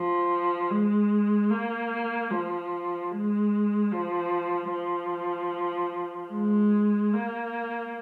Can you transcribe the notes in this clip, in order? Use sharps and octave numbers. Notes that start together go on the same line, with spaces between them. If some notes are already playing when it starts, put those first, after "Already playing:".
Already playing: F3
G#3
A#3
F3
G#3
F3
F3
G#3
A#3